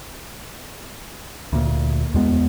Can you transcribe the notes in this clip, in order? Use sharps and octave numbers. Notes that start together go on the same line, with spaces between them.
D2 A#2
E2 G#3 B3